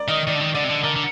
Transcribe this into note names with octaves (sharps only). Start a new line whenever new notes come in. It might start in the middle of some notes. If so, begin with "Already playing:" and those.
Already playing: A#4 D5
D#3 D#5
D#3 D5
D3
D#3
D3 D5
C3
D3
D3 A#4
D3